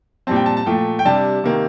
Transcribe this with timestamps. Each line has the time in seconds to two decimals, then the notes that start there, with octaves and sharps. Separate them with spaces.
0.27 A#2 G3 C4 A5
0.36 G5
0.46 A5
0.57 A5
0.66 A#2 F3 A3 G5
0.99 G5
1.05 C3 G3 D4 A5
1.44 C3 D#3 A#3